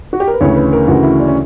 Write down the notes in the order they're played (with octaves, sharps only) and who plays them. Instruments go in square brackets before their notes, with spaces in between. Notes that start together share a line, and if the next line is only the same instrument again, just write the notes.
[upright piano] F#4
G4
A#4
B4
D2 C#3 E3 C#5
B4
A#4
D2 C#3 E3 F#4
E4
D4
C#4